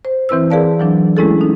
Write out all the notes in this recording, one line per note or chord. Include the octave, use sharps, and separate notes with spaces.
C5
E3 C4 E4 B4 E6
G#4 A#4 B4 D5 F5 A5
E3 F#3 D4
G#3 A3 C#4 E4 G#4 A4
D#4